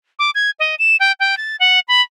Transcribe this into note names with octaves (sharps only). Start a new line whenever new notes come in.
D6
G#6
D#5
E7
G5
G5
A6
F#5
B5